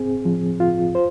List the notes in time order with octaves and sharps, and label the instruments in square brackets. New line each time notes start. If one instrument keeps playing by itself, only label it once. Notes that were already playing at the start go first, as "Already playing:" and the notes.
Already playing: [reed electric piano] C4 G#4
F3
F4
C5